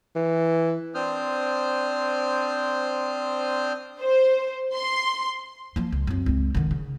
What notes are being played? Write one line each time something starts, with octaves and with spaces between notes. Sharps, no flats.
E3
C4 D4 C5 D#6 F6 G6
C5
C6
F3 A#3
C#2
F#2 C4
C#2 C4
D3 D#3
C#3